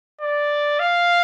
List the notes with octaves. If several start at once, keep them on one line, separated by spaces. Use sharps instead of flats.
D5
F5